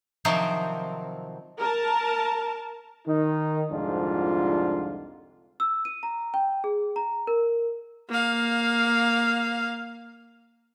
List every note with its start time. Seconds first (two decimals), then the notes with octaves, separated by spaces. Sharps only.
0.25 C3 D#3 F3 F#3 C4
1.59 A#4 A5
3.07 D#3 D#4
3.71 C2 F2 G#2 D3 D4 F4
5.60 E6
5.85 D#7
6.03 A#5
6.34 G5
6.64 G#4
6.96 A#5
7.27 A#4
8.09 A#3 F5